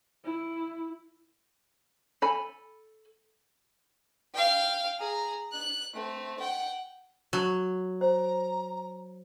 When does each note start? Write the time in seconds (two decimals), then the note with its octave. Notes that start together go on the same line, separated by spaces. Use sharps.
0.25 E4
2.22 A4 G#5 B5
4.34 F5 G5
4.99 G#4 A#5
5.52 F#6
5.94 A3 C4
6.39 F#5 G5
7.33 F#3
8.01 C5 A#5